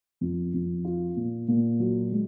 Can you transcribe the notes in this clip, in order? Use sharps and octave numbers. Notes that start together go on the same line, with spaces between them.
F2
F2
F4
A#2
A#2
F#3
G#3